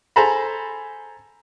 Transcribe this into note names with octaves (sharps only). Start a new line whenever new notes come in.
G#4 A4 C5 A#5 B5